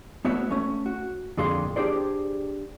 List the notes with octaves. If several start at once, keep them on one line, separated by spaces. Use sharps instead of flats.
A3 B3 F#4 C#5 E5
A3 C#4
F#4
F2 A#2 D3 G#4 F5 C6
D4 G4 G#4 C5 D5